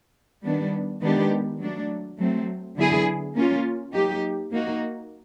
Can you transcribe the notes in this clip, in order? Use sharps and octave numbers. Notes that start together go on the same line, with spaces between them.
D#3 G3 B3 D4
D#3 G#3 B3 D4 G4
F#3 A3 D4
F#3 A3 C4
D3 F#3 B3 E4 G#4
A#3 C#4 F4
F#3 A#3 D#4 G4
A#3 D#4 F#4